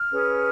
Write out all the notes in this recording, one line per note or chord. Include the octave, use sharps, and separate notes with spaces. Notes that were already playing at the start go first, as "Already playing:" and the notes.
Already playing: F6
C#4 G#4 B4